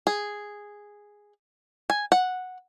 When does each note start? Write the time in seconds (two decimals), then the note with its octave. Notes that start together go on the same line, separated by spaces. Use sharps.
0.07 G#4
1.90 G#5
2.12 F#5